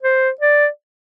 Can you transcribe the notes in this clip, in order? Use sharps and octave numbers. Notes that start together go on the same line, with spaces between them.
C5
D5